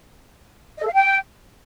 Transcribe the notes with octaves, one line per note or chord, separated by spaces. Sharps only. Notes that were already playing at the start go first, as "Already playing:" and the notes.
D#5
A4
F5
G5